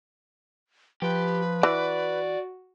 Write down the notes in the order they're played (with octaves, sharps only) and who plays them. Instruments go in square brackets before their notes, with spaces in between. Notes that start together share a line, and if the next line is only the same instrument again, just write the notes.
[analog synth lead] F3 [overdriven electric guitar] G4 [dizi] B4
[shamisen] E3 [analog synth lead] F#4 [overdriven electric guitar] D5